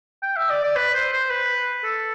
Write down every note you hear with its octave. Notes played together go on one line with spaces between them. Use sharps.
G5
E5
D5
D5
B4
C5
C5
B4
A4